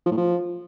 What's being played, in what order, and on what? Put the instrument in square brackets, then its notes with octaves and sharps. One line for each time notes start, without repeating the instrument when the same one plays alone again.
[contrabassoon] F3
A2
F3